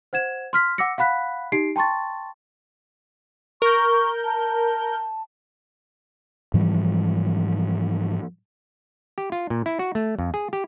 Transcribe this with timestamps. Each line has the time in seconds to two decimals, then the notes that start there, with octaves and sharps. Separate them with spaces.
0.13 C5 F#5 G#6 E7
0.53 C6 F6 B6
0.78 F#5 D6 E6 A#6 C#7
0.98 F5 F#5 B5 F#6 B6
1.52 D#4 G4 C7 D7
1.76 G5 A5 C6 C#6 A6
3.62 A#4 C#6 G6
4.24 A5
6.54 G#2 E3 F3 G3
9.18 G4
9.32 F4
9.50 A#2
9.66 E4
9.79 F#4
9.95 A3
10.19 F2
10.34 G#4
10.53 G4